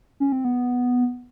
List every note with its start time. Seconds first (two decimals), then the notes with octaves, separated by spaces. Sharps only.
0.20 C#4
0.32 C4
0.45 B3